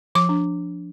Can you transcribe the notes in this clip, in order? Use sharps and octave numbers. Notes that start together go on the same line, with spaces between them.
F3 D6
D4